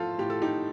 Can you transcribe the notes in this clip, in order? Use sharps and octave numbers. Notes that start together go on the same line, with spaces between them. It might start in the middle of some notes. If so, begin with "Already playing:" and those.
Already playing: A2 F3 F4 A4 C5
A2 G4
A4
D#4 G4